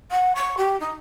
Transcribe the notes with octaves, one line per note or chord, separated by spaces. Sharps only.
F#5
C#6
G4
D#4